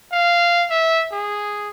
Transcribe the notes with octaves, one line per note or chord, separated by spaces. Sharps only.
F5
E5
G#4